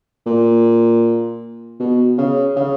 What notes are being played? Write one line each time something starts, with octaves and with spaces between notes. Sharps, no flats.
A#2
B2
C#3
C#3